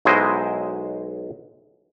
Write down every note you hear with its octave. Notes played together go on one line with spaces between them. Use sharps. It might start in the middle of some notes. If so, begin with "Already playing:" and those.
B1 F#3 G#3 E4 C5 D#5